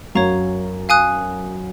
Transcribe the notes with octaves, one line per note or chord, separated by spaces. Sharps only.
F#2 F#3 C#5 F5 A#5 C#6
F5 G#5 D#6 F#6